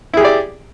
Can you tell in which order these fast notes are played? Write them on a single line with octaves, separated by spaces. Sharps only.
E4 G#4 G4 D5